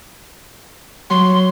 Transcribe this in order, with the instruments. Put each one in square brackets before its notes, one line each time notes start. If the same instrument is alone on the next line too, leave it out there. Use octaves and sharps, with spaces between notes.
[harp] F#3 [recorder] C6